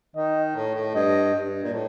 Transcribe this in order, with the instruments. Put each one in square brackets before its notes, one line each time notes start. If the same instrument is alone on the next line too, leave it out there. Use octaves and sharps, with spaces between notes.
[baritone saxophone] D#3 [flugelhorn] D#5
[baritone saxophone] A2
A2
[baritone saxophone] G2 [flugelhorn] D#5
[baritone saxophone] G2
A#2
A2